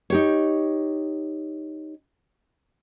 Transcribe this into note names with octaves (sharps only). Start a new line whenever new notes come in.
D#4 G4 C#5